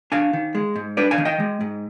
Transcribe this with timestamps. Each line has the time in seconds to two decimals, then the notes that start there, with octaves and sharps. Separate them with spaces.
0.12 D4 F5 G#5
0.33 D#3
0.55 G#3
0.76 G#2
0.97 D4 B4 D5
1.11 F5 G#5
1.18 D#3
1.25 D#5 G5
1.40 G#3
1.61 G#2